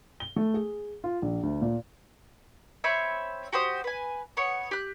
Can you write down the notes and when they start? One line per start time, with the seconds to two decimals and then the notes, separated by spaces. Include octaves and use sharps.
0.20 G7
0.36 A3
0.54 G#4
1.04 F4
1.22 A#1
1.43 D2
1.62 A#2
2.84 C4 C#5 E5 B5
3.53 F#4 G4 C5 D#6
3.84 B4 G#5
4.37 B3 C#5
4.71 G4 F#6